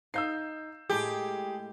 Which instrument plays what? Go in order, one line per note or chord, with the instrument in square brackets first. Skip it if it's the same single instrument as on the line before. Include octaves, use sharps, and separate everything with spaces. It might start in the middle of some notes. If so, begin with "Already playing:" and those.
[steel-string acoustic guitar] D#4 F5 [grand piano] E6 G6 C7
[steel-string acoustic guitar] A2 G#3 [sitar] G4 [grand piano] G#4